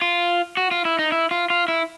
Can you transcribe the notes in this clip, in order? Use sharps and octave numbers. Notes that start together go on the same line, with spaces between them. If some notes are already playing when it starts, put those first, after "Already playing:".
F4
F#4
F4
E4
D#4
E4
F4
F4
E4